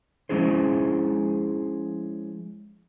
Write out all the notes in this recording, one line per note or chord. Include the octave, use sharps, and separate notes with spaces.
F3 G#3 C#4 E4 G#4 C5